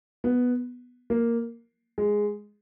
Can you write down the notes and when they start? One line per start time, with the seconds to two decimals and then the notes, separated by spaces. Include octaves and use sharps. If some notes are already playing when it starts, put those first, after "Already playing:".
0.24 B3
1.10 A#3
1.98 G#3